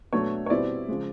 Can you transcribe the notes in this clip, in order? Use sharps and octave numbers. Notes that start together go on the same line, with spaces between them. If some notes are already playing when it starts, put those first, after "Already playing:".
B2 F#3 A3 D4 C#5
C#5
B2 G3 C4 E4 D5
C#3 F3 G#3